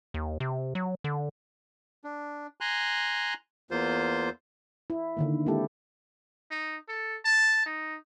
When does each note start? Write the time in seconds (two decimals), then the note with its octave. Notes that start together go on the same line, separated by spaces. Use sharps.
0.14 D#2
0.40 C3
0.75 F#3
1.04 D3
2.04 D4
2.61 G#5 A#5 C6 F#6
3.71 E2 A#3 F4 C5
4.90 E4
5.17 D3 D#3 A#3
5.46 G#3 A#3 C4 E4 G4 A4
6.51 D#4
6.89 A4
7.25 A5
7.66 D#4